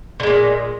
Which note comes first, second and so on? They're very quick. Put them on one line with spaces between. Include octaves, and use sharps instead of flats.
D3 G#3 A#2